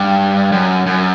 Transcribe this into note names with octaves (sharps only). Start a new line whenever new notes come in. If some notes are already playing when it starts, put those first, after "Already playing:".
Already playing: G2
F#2
F#2